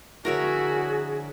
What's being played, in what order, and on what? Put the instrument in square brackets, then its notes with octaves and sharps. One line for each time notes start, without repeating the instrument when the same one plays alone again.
[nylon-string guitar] D3 F3 E4 [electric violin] F#4 [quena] G#4 [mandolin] A#4 C#5 E5